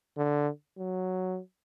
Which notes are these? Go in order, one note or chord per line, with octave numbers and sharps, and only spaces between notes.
D3
F#3